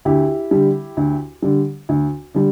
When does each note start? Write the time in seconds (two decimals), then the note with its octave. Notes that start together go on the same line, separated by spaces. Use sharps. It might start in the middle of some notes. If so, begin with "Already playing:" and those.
0.05 D2 E4 G4
0.51 D3 G3
0.97 D2
1.42 D3 G3
1.89 D2
2.34 D3 G3